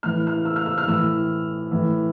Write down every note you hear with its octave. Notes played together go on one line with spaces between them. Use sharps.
A2 E3 F6
F6
E6
F6
E6
F6
A2 E3 E6
A2 E3